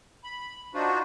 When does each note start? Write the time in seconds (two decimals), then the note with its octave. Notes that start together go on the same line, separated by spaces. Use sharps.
0.24 B5
0.74 D4 D#4 F4 F#4 C5